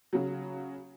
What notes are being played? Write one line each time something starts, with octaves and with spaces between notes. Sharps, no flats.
C#3 F#3